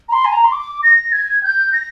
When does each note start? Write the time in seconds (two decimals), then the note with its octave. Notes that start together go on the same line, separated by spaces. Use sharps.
0.09 A#5
0.13 C6
0.25 G#5
0.33 A#5
0.44 C6
0.52 D6
0.83 A#6
1.12 G#6
1.43 G6
1.73 A#6